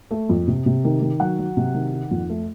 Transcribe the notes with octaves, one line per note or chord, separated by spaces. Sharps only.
A3
F2
C3
C3
D#3
D#3
F#3 F#5
F#3
C3
D#3
D#4
F2
A3